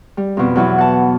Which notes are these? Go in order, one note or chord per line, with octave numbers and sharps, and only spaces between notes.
G3
F2 B2
E2 F#3 E4
F#5 A5